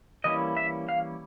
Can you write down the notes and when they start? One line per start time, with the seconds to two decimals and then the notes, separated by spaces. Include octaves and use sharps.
0.24 E3 G3 A#3 C#4 E4 D#5
0.57 E5
0.89 F5